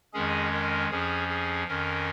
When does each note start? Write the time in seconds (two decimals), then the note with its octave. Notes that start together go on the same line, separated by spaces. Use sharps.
0.13 F2 D#3 G#3 C#4 G#4
0.52 A#4
0.90 F2 F3 C#4 G#4
1.29 G#4
1.67 F2 D#3 C#4 A#4